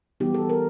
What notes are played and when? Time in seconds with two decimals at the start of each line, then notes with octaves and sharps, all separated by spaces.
0.20 E3 G3 B3 D#4 G4
0.34 A4
0.49 A#4